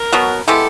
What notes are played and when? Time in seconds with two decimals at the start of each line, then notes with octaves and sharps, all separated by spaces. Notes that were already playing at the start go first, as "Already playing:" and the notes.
Already playing: A#4
0.13 B2 F#3 B3
0.48 G#3 B3 E4 G4 A4